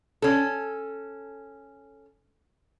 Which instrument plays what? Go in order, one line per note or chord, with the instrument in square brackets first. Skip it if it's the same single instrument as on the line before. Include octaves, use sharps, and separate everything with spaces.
[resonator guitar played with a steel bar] C#4 A4